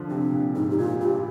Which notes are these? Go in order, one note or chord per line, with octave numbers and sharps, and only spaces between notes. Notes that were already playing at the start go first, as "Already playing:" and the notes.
Already playing: D3 F3
C3 D4
A#2
G#2 D#4
G4
A#2 F4
G2 G4